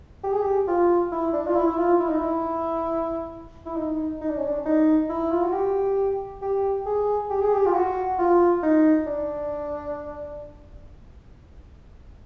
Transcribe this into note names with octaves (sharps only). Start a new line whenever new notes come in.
G4
G#4
G4
F4
E4
D4
F4
E4
E4
F4
E4
D#4
E4
E4
D#4
D#4
D4
C#4
D4
D#4
E4
F4
F#4
G4
G4
G#4
G4
G#4
G4
F4
F#4
F4
D#4
D4